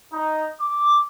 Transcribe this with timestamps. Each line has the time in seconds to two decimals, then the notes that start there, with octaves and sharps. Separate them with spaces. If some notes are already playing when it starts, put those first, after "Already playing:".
0.12 D#4
0.60 D6